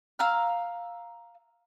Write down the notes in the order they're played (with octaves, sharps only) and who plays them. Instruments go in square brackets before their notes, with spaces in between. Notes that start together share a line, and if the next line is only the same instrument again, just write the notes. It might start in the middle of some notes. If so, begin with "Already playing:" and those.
[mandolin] F5 A#5 E6 F6